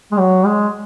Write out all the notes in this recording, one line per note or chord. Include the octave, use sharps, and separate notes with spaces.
G#3
F#3
G#3